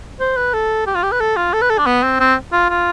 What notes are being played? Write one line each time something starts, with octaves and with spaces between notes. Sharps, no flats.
C5
B4
A4
G4
F4
G4
B4
A4
F4
A4
B4
A4
D4
B3
C4
C4
F4
F4